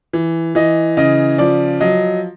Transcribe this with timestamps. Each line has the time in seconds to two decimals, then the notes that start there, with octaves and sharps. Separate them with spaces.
0.13 E3
0.55 E3 D#5
0.97 C#3 D#5
1.38 F3 D5
1.81 F#3 D#5